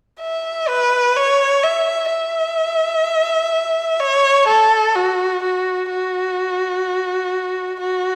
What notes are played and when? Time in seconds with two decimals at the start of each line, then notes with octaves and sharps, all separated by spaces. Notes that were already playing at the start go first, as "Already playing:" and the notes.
0.21 E5
0.69 B4
1.16 C#5
1.63 E5
2.11 E5
4.01 C#5
4.48 A4
4.95 F#4
5.43 F#4
5.90 F#4
7.80 F#4